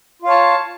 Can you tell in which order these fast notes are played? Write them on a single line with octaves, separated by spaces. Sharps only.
F4 F5 C#5 A5